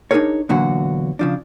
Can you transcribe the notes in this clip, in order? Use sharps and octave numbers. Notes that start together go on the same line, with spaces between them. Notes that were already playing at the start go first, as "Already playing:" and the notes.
D4 D#4 F4 G#4 A#4 C#5
E2 A#2 D3 F#3 F#4
C#3 F3 D4